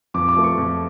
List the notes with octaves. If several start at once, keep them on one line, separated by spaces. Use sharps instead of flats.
F2 D6
D6
F3 A3
C#6
F2